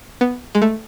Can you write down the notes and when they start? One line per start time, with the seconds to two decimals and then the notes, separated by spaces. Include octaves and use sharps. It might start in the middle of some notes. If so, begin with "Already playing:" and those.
0.21 B3
0.55 G#3
0.62 A3